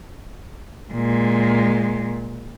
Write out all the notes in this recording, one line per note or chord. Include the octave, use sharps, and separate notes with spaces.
A#2 G#3